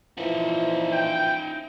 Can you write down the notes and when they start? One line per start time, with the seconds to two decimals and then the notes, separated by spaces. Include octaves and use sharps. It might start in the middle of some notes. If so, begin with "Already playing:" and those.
0.18 A#2 E3 F3 D#4 E5
0.93 G5